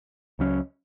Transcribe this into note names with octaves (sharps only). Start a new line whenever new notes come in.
C#2 C#3 F#3 C#4